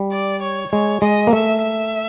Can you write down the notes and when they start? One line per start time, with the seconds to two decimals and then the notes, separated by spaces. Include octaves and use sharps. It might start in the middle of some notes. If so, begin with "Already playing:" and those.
Already playing: G3
0.12 D5
0.42 C#5
0.72 G#3 C#5
1.02 G#3 D#5
1.27 A#3
1.33 A3 E5
1.63 E5